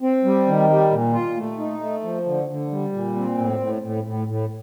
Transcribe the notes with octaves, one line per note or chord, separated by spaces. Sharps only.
C4
G3
D#3
G3
A#2
F4
A3
D#4
A3
F3
D3
D3
G3
A#2
C4
A2
A2
A2
A2
A2